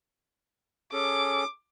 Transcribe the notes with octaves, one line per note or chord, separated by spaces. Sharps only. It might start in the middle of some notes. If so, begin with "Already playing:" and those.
C#4 G#4 A4 D6